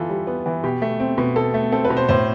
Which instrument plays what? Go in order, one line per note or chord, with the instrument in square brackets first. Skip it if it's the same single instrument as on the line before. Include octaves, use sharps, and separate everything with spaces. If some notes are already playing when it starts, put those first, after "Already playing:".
Already playing: [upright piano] E3 B3 F4 A4
G3
B3
E3
B2 G4
A3
C4
B2
B2 A4
A3
C4 A4
B4
B2
C5
A2 C5